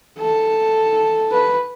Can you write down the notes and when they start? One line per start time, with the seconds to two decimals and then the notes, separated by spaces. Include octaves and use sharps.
0.18 A4
1.32 B4